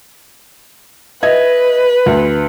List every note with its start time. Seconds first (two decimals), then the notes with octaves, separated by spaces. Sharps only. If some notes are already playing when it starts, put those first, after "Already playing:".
1.23 B4 D#5 E5 G#6
2.06 D2